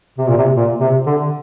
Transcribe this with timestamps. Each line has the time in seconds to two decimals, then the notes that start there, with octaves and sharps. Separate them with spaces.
0.18 C3
0.28 A#2
0.37 C3
0.56 A#2
0.80 C3
1.06 D3